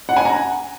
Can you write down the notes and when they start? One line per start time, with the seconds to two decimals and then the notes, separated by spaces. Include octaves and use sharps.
0.09 F#5
0.16 G#5
0.25 A#5